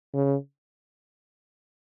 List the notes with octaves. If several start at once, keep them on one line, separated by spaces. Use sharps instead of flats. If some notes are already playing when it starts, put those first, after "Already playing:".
C#3